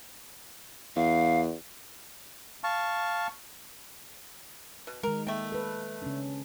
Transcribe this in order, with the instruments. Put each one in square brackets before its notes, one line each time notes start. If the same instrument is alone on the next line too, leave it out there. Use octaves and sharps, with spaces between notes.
[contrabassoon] E2 [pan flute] F5
[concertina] F5 A5 C#6
[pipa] B2
[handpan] D#3 G#3 [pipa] A#4
[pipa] A3 G5 [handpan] A#3
[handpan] A4 B4
C#3 C#4 D4